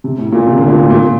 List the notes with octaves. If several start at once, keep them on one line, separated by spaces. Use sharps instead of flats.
C3
A2
A#2
C3
D3
A#2
A2
A#2